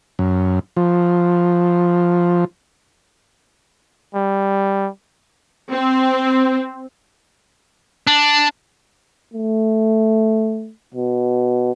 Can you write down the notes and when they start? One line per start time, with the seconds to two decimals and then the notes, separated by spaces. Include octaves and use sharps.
0.19 F#2
0.77 F3
4.15 G3
5.72 C4
8.07 D4
9.34 A3
10.94 B2